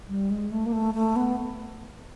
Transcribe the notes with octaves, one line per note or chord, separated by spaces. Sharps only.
G3
G#3
A3
A#3
A3
A3
B3